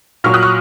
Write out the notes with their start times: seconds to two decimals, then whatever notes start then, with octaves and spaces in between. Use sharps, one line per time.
0.24 A#2 F#3 C#6 F6
0.34 D#6 F#6
0.43 C#6 F6